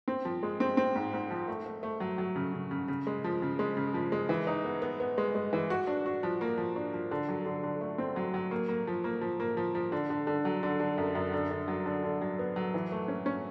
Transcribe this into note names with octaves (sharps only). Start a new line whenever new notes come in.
C4
F3
G#3
C4
C4
G#2
G#2
F3
A3
A3
A3
F#3
F#3
C#3
C#3
C#3
C#3
G#3
F3
C#3
G#3
C#3
F3
G#3
E3
D#4
B3
B3
B3
G#3
G#3
E3
F#4
D4
F#4
F3
A#3
F3
D4
F3
D3
F#3
D3
D3
A3
C4
F#3
F#3
A#3
A#3
F3
A#3
F3
A#3
F3
F3
D3
D3
D3
F#3
D3
D3
F#2
F#2
D3
D3
F#3
D3
D3
F#3
B3
F#3
E3
A3
C#4
C#4